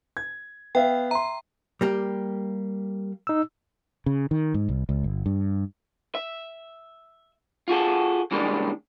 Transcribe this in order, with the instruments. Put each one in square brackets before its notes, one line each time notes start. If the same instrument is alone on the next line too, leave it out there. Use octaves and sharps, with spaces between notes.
[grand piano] G#6
[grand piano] B3 E5 F5 [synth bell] G5
[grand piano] E5 C6 [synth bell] A#5
[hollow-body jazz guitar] G3 A#3 G4
[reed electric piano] D#4 E6
[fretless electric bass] C#3
D#3
G#2
C2
C#2
G1
G2
[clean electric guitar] E5
F4 F#4 G#4 A4
C#3 E3 G3 G#3 A#3 D4